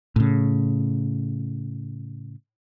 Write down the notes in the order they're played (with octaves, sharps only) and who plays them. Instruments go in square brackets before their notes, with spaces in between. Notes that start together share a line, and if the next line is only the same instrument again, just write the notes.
[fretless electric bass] A2 C#3